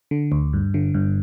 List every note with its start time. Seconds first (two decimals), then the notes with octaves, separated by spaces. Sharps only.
0.11 D3
0.32 D2
0.53 G2
0.74 D3
0.94 G2